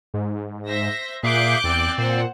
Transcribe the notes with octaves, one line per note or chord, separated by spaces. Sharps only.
G#2
C5 E5 A#6
A#2 G#4 E5 F5 D6 F#6 G6
E2 C4 D5
A#2 C5 F#5